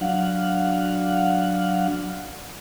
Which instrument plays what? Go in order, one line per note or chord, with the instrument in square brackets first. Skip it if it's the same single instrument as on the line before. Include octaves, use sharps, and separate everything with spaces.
[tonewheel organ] F#3 D4 F5 F#5